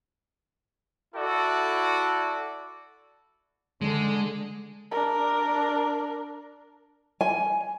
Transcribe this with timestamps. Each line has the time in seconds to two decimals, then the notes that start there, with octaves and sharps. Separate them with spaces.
1.15 E4 F#4 A4 D5
3.82 D3 G#3
4.91 D4 A#4
7.21 G#5